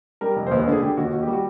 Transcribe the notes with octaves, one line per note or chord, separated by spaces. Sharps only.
G3 A#4
F1
C5
D#2 B4
B4
D3
G#4
D3 G4
D#2 F#4
D#2 F#4
G4
G3
F#4